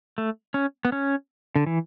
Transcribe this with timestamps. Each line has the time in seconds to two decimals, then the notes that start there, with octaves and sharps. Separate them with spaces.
0.18 A3
0.54 C#4
0.85 B3
0.92 C#4
1.56 D3
1.67 E3